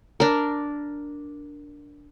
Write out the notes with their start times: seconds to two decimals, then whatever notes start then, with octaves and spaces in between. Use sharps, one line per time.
0.20 D4 A#4